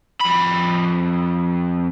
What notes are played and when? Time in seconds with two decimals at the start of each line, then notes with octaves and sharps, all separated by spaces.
0.21 F2 B5